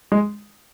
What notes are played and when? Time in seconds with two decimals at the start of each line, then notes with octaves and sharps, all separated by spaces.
0.12 G#3